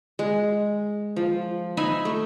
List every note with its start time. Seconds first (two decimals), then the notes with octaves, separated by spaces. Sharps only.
0.19 G#3
1.16 F3
1.77 D#4 E5 G#5 B5
2.05 A3